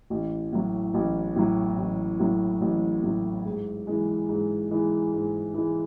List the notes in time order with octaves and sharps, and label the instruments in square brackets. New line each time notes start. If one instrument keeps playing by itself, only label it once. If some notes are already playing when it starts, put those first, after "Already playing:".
[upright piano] A1
A2 F#3
A1
A2 F#3
A1
A2 F#3
A1
A2 F#3
G#2
E3 G#3
G#2
E3 G#3
G#2
E3 G#3